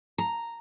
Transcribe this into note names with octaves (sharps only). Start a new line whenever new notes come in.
A#5